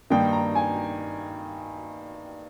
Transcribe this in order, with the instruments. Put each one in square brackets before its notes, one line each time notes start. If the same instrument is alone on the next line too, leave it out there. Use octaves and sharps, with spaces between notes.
[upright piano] G2 D#3 A#3 D#4 G5
A#5
G#5